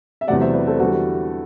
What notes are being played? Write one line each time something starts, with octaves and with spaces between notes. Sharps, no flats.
E5
E2 C3 F#3 A3 D5 F#5
C5 E5
B4 D5
A4 C5
E2 D3 G3 F#4 A4